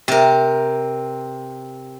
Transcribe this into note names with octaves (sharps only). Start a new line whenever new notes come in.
C3 A#4